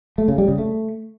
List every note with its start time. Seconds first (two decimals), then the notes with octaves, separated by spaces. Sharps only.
0.18 A3
0.28 C#3
0.38 G3
0.48 C#3
0.58 A3